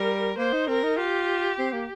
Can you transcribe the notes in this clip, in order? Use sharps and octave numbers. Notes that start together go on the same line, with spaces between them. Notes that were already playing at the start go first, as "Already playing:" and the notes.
Already playing: G3 A#4
A#3 C5
D#4
C4 A#4
D#4
F4 G4
C4
A#3